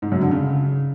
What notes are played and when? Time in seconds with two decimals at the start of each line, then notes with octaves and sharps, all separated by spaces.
0.02 G#2
0.12 F#2
0.21 D3
0.31 C#3